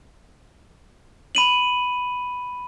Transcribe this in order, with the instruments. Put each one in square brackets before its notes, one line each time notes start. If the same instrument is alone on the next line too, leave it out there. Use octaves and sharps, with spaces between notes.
[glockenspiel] B5 D#7 F#7